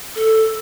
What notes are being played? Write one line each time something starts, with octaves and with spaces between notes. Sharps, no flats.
A4